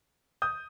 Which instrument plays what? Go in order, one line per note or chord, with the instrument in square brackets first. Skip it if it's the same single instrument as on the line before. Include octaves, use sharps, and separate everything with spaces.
[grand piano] D#6 G6